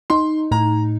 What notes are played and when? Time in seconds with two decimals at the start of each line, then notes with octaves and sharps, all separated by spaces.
0.10 D#4 C6
0.51 A2 A#5